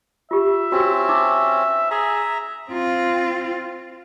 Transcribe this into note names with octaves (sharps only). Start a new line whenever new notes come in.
F4 G4 E5
C4 C#4 F#4
D#4 D6
G#4 E5 A#5
C4 F4